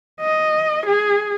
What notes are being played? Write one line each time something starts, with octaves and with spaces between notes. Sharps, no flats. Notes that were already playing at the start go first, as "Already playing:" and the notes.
D#5
G#4